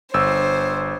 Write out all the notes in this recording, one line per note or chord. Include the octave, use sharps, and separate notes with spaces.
G1 C5 E6